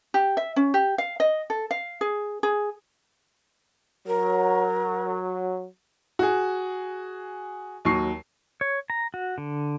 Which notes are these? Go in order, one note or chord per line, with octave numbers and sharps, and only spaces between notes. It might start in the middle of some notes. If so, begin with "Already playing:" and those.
G4
E5
C#4
G4
F5
D#5
A4
F5
G#4
G#4
F#3 A#4
F#4 G#4
D#2 F#3 C#6 C7
C#5
A#5
F#4
D3